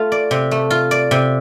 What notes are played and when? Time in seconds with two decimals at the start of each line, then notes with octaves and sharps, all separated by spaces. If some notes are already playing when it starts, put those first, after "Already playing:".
Already playing: A3 F4
0.12 D5
0.31 C3
0.51 A3
0.71 F4
0.91 D5
1.11 C3